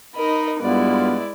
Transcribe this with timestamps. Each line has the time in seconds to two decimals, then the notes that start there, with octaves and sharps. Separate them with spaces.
0.15 D#4 A#4 D#5 B5
0.61 G2 G#3 B3 E4 F4 B4 D5